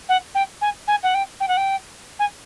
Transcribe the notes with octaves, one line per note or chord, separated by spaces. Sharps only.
F#5
G5
G#5
G#5
F#5
G5
G5
F#5
G5
G#5